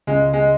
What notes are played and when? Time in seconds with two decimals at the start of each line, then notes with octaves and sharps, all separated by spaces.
0.07 C#2 G#3
0.33 G#3